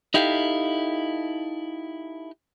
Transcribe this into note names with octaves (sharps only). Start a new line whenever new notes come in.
D#4 E4 G4 A4 F5